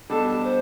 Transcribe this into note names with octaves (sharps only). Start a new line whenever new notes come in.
B2 G3 D4 A4 A5
C5